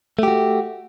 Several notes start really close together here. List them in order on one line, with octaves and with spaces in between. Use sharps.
A3 G4 F#4